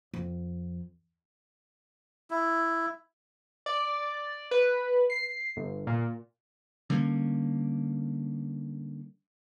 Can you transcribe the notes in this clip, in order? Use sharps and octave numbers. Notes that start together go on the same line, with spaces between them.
F2
E4
D5
B4
C7
G1
A#2
D3 G3 A#3 C#4